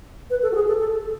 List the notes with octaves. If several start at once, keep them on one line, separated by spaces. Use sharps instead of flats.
B4
A4
F#4
G#4
A4
A4